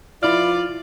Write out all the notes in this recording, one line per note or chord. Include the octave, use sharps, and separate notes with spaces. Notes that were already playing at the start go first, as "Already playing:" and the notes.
F3 E4 F4 B4 D5 F6